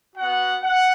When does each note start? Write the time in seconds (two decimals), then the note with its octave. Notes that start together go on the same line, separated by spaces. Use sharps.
0.16 F#4 F#5
0.21 B3
0.63 F#5